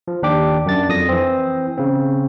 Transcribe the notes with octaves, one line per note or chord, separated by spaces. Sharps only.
F3
D#2 D4 G4 D6
F#2 D4 A6
F2 D#6 A#6
E3 C4
C#3 C4